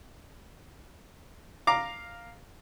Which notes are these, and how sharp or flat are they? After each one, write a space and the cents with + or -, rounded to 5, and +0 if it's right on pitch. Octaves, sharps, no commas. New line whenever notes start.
F5 +0 A#5 +0 D6 +5